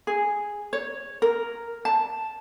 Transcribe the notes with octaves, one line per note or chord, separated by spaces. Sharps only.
G#4
C#5
A#4
A5